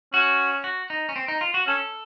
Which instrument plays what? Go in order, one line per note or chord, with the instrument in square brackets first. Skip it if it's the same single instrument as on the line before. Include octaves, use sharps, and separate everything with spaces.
[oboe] C#4 [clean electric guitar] F#4
[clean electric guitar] F#4
D#4
C#4
C4
D#4
F4
F#4
[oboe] C#4 [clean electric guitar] A4